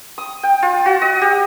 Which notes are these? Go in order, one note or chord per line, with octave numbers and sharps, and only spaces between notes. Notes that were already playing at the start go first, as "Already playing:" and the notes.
D#6
G5
F4
F#4
D#5
G4